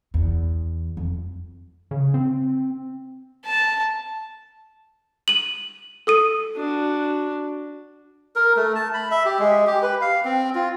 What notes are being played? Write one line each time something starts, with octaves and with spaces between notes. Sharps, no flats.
E2
F2
C#3
C4
A5
D#7 F#7
A4 D#6 D#7
D4 F#4
A#4
A3
A5
B5
E5
G4
G#3
G4
B4
F5
C4
F4